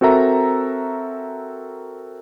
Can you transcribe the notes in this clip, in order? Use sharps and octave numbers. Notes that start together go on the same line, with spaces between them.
C4 F#4 A4 A#4 E5 A#5